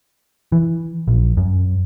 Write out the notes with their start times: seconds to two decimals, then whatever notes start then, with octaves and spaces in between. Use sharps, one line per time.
0.52 E3
1.08 A#1
1.37 F#2